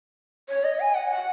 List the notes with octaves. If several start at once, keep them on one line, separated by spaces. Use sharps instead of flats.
C#5
D#5
G#5
F#5
F#5